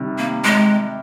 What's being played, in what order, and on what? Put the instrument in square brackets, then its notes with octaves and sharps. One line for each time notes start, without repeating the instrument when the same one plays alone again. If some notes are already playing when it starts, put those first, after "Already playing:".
Already playing: [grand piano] C3 D#3 G3
[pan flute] A#3
G#3